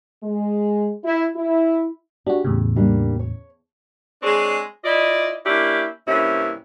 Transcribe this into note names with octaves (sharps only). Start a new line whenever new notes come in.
G#3
E4
E4
D4 F#4 G4
E2 A2 C#3
G3 A#3 D4
C#5
G#3 C4 D4 G#4 C#5
E4 F4 D5 D#5
A#3 C#4 D4 E4 G4
G2 C3 A#3 C#4 E4